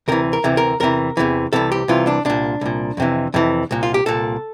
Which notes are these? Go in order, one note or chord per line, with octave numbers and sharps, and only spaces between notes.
D2 C3 E3 A#4
A#4
D2 C3 E3
A#4
E2 C3 E3 A#4
E2 C3 E3
C2 C3 E3 A4
G4
C2 C3 E3 F4
D4
C2 A#2 D4
C2 A#2
F2 C3 E3
F2 C3 E3
C2 A#2
F4
G4
C2 A#2 A4